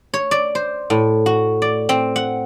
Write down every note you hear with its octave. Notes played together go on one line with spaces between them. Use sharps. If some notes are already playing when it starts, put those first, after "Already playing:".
C#5
D5
C5
A2
F#4
D5
C4
F#5